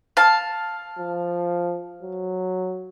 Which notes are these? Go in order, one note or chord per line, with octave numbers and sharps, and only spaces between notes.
F5 A5
F3
F#3